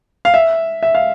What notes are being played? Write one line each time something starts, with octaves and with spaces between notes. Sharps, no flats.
F5
E5
E5
F5